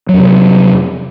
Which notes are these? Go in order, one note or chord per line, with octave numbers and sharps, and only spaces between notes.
F2 C3 F#3